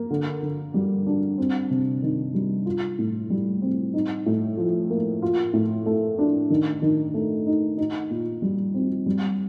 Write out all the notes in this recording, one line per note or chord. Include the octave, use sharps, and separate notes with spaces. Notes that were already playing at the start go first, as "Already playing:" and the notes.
Already playing: A#3
D3
D3
G3
D4
C4
C3
D#3
G3
F4
A2
G3
C4
D#4
A2
F3
A#3
F4
A2
A3
D4
D#3
D#3
A3
D#4
D#4
A#2
G3
C4
G3